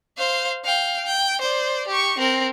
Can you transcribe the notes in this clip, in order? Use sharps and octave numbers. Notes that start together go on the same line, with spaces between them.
C5 F5
F5 G5
G5
C5 D5
G4 C#6
C4 A#4